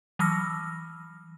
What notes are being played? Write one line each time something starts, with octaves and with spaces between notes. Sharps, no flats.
E3 F#3 E6 F6 A#6